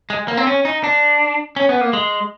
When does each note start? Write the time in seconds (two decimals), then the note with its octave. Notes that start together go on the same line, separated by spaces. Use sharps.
0.10 G#3
0.28 A#3
0.37 C4
0.47 C#4
0.65 D#4
0.83 D4
1.56 C#4
1.69 B3
1.81 A#3
1.93 G#3